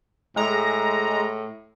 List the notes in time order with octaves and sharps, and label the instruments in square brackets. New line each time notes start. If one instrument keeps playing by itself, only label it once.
[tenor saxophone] A2 [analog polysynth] G#3 A#5